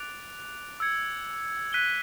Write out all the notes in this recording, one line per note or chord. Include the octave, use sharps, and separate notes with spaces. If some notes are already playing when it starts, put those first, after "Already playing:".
Already playing: D6 F#6 A6 D7 F7
E6 G#6 C#7
F#6 B6 D#7 G7